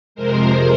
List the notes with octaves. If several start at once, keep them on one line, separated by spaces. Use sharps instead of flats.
F2 C3 F3 G#3 A#4 C5